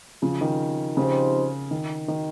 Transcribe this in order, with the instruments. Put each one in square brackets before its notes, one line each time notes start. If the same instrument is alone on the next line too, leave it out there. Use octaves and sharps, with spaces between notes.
[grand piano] C#3 F3
D#3
[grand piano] C#3 [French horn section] F3 C4 D#4 G4 C5
[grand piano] D#3
D#3